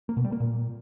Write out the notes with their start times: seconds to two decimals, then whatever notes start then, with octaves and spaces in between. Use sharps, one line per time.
0.09 A#3
0.17 B2
0.25 G3
0.32 A#3
0.40 A#2